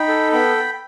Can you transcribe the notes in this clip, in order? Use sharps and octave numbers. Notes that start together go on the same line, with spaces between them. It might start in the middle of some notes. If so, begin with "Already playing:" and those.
Already playing: D#4 G5 B5
A4
B3 G5 B5